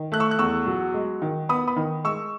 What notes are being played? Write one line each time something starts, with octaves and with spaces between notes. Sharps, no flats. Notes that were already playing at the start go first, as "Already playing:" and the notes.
Already playing: D#3
A3 F#6
C#6 E6
F#6
E2 C#6 E6
F#3
G#3
D#3
B3 B5 D#6
B5 D#6
D#3
G#3 C#6 E6